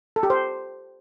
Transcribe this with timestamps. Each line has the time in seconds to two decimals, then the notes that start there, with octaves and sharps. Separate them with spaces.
0.16 A4
0.23 G4
0.30 C5